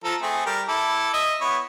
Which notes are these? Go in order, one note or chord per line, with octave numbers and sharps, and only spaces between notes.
F3 A4 A#5
A3 C4 G#4
G3 G4 A#4
E4 A4 D6
D#5 E5
B3 E4 C#5